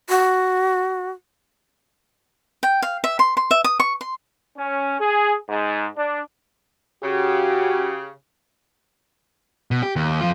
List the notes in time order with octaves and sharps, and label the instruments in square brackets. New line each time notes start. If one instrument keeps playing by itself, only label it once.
[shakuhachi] F#4
[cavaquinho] G5
F5
E5
C6
C6
E5
D#6
C#6
C6
[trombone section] C#4
G#4
G#2
D4
[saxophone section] C#3 [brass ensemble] F#4 [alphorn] G4
[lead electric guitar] B2
G4
D#2
F2 F4